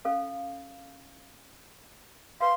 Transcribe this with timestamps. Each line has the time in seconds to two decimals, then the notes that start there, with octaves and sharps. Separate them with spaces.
0.05 C#4 A4 F5
2.41 B4 F5 C6